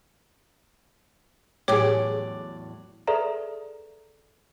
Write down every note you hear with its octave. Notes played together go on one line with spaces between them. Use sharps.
E2 A2 F#3 G4 G#4 C#5 D5 D6
G#4 A4 B4 D5 E5 A#5